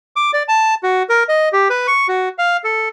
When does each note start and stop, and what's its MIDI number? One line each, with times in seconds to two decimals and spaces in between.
0.16 0.31 86
0.33 0.43 74
0.48 0.74 81
0.83 1.03 66
1.09 1.24 70
1.29 1.49 75
1.53 1.68 67
1.70 1.87 71
1.87 2.07 85
2.08 2.29 66
2.38 2.57 77
2.64 2.89 69